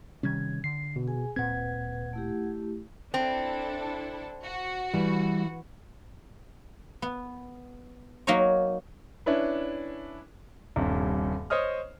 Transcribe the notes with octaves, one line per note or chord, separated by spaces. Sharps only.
C3 D#3 G3 C#4 G#6
D3 C7
B2
G#4 G#5
D1 A#2 C4 B4 F#5 G#6
A3 E4 G4
C4 D4 E4 A4
F#4
E3 G3
B3
F#3 A#3 D#4 A#4 C#5
C#4 D4 E4 B4
D#1 G2 C3
C5 C#5 D#5 D#6 F6